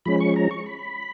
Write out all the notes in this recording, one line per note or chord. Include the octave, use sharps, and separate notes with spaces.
F3 G#3 C#4 B5
C#6
A#5
C#6
B5